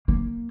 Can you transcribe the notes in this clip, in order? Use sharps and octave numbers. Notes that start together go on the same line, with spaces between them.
A#3